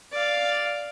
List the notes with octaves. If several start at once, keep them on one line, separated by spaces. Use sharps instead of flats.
D5 F5